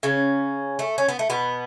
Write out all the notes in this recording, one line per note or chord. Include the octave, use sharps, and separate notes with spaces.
C#3 C#4
A3
C#4
B3
A3
B2 B3